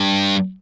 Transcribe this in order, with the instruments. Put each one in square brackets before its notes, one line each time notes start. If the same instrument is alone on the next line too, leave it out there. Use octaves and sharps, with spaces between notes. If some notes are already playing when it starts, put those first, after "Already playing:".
Already playing: [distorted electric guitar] G2